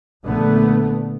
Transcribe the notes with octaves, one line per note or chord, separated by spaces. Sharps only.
A#1 D3 A3 B3